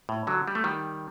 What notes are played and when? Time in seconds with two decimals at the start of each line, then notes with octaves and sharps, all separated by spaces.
0.09 A2
0.27 D3 F#3
0.48 G3
0.55 A3
0.64 D#3 G3